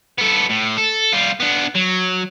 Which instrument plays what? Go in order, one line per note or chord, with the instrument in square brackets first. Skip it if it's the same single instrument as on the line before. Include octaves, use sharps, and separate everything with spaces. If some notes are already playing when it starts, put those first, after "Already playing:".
[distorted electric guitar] B3 A4
A2
A4
G3 F4
B3 D4
F#3